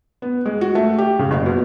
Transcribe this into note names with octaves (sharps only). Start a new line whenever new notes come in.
B3
G#3
F#4
A3
G4
C#3
F#1
B2